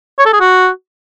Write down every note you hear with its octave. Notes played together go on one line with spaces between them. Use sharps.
C#5
A4
G#4
F#4